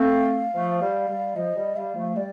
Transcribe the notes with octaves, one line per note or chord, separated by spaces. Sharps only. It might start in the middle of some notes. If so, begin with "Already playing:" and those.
Already playing: A3 C4 F5
F3 A3
G3
G3
F3 D#5
G3
G3 F5
F3 A3
G3 D5